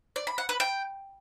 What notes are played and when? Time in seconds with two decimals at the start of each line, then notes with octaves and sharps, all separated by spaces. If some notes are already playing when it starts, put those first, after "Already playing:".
0.16 D5
0.27 B5
0.38 F#5
0.49 B4
0.60 G5